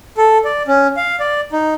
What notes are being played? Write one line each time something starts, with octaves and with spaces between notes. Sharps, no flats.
A4
D5
C#4
F5
D5
D#4